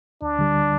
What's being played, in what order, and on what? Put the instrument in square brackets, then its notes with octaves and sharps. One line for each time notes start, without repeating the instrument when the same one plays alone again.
[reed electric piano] D2 [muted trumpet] D4
[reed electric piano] D3 G3